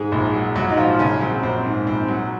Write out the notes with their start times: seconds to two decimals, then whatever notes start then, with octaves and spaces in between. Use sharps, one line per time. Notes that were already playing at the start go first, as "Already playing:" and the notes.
Already playing: G#2 G#3 G#4
0.12 A#1
0.34 F#3
0.55 A#1 F#3 F#4
0.70 D#4
0.77 G#2 F3 F4
0.99 A#1 C#3 C#4
1.21 F#3 C4
1.43 A#1 C4
1.65 G#2
1.87 A#1 C4
2.08 F#3